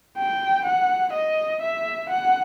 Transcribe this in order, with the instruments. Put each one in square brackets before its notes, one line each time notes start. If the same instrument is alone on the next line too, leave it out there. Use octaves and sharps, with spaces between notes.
[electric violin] G5
F#5
D#5
E5
F#5